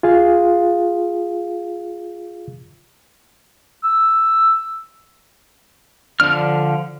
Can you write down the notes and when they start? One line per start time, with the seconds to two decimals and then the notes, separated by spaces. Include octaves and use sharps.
0.03 F4 G#4 F5
3.84 E6
6.20 D3 F3 D4 F6